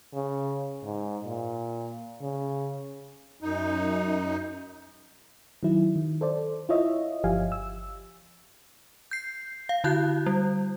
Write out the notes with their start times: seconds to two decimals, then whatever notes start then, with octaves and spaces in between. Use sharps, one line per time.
0.14 C#3
0.83 G#2
1.24 A#2
2.22 C#3
3.40 F#2 D#4
5.63 D#3 F#3 E4
5.96 D#3
6.21 A4 C5 D5
6.69 E4 F4 C#5 D#5 E5
7.24 G1 F3 G4 F5 G#5
7.52 E6
9.11 G6 C7
9.69 F5
9.84 D3 E4 F#4 F#6 G6
10.26 G3